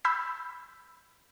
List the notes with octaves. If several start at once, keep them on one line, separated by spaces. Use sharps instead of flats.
B5 E6 G6 G#6 B6 C7